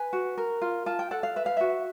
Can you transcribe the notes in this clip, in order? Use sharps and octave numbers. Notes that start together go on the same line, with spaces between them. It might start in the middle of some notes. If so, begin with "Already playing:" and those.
Already playing: B4 G#5
F#4
A#4
F4
F4 A5
G5
A4 F#5
F5
B4 E5
F5
F#4 E5